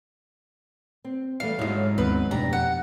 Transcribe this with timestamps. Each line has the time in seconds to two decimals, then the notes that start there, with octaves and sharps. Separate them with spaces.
1.04 C4
1.40 E2 G3 A3 F5
1.59 G#2 D3 F#3 E4
1.98 D#2 B3 C4 B4
2.31 F2 B2 A3 D4 G4 A#5
2.53 F#5